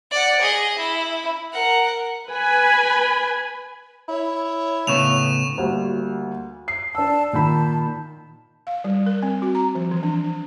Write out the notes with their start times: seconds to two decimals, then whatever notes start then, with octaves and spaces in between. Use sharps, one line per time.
0.11 D5 F#5
0.41 G#4 D#5
0.78 E4
1.53 A#4 F#5
2.29 B4 G#5 B5
4.08 E4 C#5
4.87 A2 C#3 B3 C#6 E7 F7
5.58 D2 G3 A#3
6.68 C7
6.95 D4 A5 E6
7.33 A#2 D#3 A5 B5
8.67 F5
8.84 G3
9.06 A#4
9.23 C4
9.42 F#4
9.55 A#5
9.75 F3
9.91 E3
10.03 D4
10.24 D4